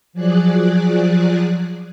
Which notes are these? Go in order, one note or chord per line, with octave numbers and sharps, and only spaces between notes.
F3 F#3 G#4 D5 F#6